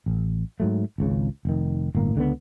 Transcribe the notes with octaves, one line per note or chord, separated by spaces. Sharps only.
A1
G#2 F#3 A3
G#1 C#2 C#3
F1 D#3
G1 A2 A#3
C#2 D3 G3 B3